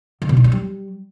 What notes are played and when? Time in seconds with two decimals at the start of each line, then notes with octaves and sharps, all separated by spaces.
0.22 D3
0.29 B2
0.37 D#4
0.44 D4
0.52 G3